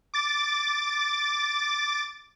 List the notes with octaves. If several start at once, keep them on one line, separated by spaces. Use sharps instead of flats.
D6 A6